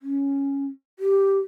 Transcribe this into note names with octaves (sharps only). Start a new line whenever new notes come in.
C#4
G4